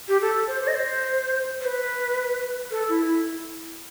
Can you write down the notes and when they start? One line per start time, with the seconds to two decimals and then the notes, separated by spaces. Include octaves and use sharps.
0.08 G4
0.22 A4
0.48 C5
0.61 C5
0.67 D#5
0.75 C5
1.61 C5
1.65 B4
2.71 A4
2.89 E4
3.06 E4